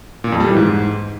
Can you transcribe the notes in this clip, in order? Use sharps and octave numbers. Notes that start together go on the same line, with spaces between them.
A#2
F2
G3
E3
G#2